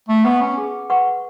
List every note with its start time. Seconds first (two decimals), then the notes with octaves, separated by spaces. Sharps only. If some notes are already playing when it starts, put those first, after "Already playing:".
0.09 A3
0.25 B3 B4 F#5 C#6
0.41 C#4
0.57 G#4
0.90 B4 F#5 C#6